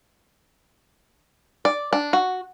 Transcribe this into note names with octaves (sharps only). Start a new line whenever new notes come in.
D5
D4
F#4